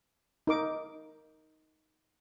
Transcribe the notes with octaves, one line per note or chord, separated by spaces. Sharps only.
D#4 A#4 D6